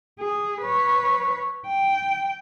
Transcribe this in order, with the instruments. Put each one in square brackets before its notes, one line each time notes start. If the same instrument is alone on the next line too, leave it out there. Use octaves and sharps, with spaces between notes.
[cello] G#4
B4 C#5
G5